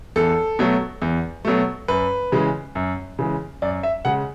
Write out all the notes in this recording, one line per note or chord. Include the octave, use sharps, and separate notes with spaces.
E2 A4
B2 F#3 A3
E2
B2 F#3 A3
F#2 B4
C#3 E3 G#3
F#2
C#3 E3 G#3
F#2 D5
E5
C#3 G#3 F#5